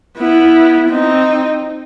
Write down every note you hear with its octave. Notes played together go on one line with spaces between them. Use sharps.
B3 E4
C4 D#4